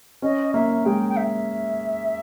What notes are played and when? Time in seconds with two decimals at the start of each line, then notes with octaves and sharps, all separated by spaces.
0.22 C#4 D#5
0.54 A#3 E5
0.85 G#3 G5
1.09 G5
1.17 E5